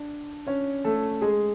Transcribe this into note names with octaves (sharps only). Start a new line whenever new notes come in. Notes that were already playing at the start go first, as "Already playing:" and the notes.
Already playing: D4
C#4 C#5
A3 A4
G#3 G#4